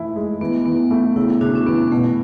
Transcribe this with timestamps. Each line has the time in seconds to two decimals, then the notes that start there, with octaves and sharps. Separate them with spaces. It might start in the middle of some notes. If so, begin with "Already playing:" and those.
Already playing: E3 A3 E4
0.16 G#3
0.41 E3 B3
0.66 E3 B3
0.91 A3 B3
1.16 C#3 E4
1.41 C#3 D4 F#4
1.55 C#4
1.67 E3 B3
1.92 B2 A3